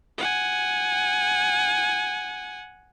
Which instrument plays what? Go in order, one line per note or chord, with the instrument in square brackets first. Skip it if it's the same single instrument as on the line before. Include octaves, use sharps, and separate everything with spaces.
[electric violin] F#5 G#5